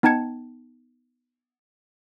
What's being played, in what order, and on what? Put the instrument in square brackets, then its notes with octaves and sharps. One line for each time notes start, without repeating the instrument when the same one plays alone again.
[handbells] B3 D#4 G5 A5 G#6 C#7